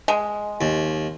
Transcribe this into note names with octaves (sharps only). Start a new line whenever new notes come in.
G#3
D#2